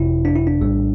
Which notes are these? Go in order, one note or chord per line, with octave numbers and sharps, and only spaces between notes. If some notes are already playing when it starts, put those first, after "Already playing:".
Already playing: G1 F2 C3 E4
D4
E4
D4
A#1 A2 G3